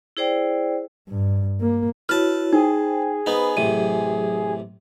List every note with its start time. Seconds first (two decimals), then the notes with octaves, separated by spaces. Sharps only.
0.17 E4 G#4 C5 D5 G5
1.09 G2
1.61 A#3
2.09 E4 F#4 B4 C#5 A5 F6
2.53 D#4 G#4 C5 G5
3.26 B3 D#4 B4 C5 B5
3.57 A1 C3 F#3 D#7